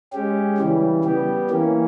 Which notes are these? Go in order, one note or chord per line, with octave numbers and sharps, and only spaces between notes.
G#3 C#4 G4
C#3 E3 G3
G3 B3 G4
E3 A#3 C#4